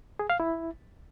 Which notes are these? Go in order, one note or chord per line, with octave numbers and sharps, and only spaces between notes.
G#4
F5
E4